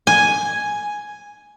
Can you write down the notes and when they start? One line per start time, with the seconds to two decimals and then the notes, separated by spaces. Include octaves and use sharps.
0.07 G#5